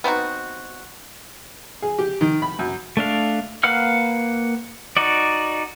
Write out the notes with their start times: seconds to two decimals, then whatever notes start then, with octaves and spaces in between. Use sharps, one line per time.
0.04 B3 C4 D#4 F#4
1.82 G#4
1.98 G4
2.21 D#3
2.42 B5
2.59 F#2
2.97 A3 D4 F5
3.63 A#3 B4 F5 F#5 F6
4.97 D#4 F#4 D5